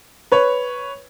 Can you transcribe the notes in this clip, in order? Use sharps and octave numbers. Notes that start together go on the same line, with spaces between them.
B4 C#5